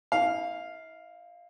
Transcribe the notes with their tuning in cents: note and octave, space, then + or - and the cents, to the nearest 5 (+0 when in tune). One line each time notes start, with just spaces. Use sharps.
E4 -35 F5 +0